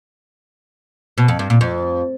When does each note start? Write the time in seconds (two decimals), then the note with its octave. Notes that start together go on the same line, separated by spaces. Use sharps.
1.18 B2
1.28 F2
1.39 G2
1.50 A#2
1.61 F2